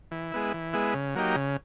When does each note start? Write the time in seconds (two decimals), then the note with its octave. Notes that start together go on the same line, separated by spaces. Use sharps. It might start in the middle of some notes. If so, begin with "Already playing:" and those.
0.11 E3
0.32 G#3 B3 E4
0.53 E3
0.73 G#3 B3 E4
0.94 C#3
1.15 F#3 A#3 D#4 G4
1.36 C#3